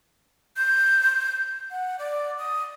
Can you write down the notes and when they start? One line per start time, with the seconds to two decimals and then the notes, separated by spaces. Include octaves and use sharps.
0.56 G6
1.71 F#5
1.99 D5
2.38 D#6